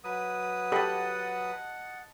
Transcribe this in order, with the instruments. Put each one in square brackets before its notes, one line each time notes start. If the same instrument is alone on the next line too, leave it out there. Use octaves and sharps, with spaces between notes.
[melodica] F#3 B4 D#6
[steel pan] G4 A4 B5 [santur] D#5 A5 [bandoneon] F#5